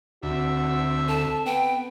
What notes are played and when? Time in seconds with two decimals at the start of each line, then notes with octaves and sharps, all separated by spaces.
0.23 D2 C4 F#4 E5
1.09 A4 A5
1.46 B3 G5